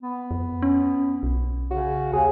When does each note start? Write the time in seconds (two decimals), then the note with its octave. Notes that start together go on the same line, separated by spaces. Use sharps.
0.03 B3
0.31 F2
0.62 C#4
1.23 B1
1.71 C#3 F#4
2.13 D#2 G#4